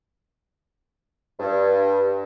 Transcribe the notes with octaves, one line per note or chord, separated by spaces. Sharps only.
G2